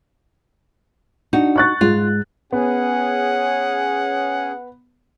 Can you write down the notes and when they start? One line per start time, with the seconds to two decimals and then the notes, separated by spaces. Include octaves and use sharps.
1.33 D4 D#4 F#4
1.56 C#6 F#6 A6
1.81 G#2 F4
2.52 B3 C#4 G#4 F#5